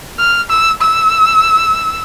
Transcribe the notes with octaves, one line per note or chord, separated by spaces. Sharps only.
F6
E6
E6